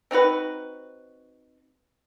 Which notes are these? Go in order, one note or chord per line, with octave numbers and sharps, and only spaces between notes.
C4 D#4 F#4 B4